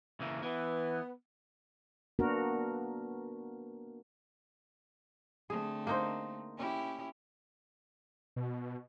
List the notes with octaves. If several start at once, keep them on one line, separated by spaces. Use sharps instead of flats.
C#3 E3 A#3
E3 B3
A#3 B3 D4 F#4 A#4
D3 A3 C4 G#4
A#3 D#4 C5
C#4 E4 G4
B2